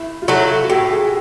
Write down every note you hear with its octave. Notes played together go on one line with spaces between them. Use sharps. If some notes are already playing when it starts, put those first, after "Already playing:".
Already playing: E4
F4
F#3 A3 E4
F#4
A2 G4
G#4